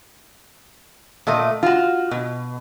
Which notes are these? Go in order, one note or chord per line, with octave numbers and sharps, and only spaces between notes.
A#2 A3 D#5
F4 F#4
B2